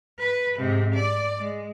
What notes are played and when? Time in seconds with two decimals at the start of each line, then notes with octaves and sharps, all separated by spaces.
0.19 B4
0.59 G#2 C3
0.94 D5
1.39 G#3